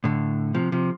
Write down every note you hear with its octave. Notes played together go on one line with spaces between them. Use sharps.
A2 D3
C3 F3
C3 F3